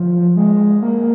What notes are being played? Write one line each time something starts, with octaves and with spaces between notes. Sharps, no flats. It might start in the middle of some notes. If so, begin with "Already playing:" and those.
Already playing: F3
G#3
A#3